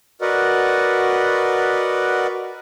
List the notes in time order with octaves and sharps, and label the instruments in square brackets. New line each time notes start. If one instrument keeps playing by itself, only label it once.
[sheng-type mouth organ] F#4 A#4 B4 D5 D#5 F#5